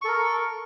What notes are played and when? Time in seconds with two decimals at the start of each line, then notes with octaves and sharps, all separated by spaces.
0.02 C#6
0.05 A4
0.08 A#4